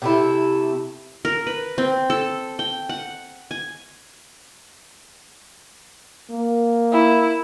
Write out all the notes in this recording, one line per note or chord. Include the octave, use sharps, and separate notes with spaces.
C3 A3 E4
A#4
B4
C4
A4
G5
F#5
G#5
A#3
E4